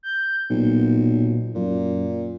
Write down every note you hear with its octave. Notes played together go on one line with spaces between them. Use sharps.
G6
B1 A#2
F#2 A#2